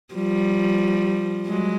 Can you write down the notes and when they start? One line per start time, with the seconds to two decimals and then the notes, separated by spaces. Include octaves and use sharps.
0.14 F3 G3
1.46 F#3 G#3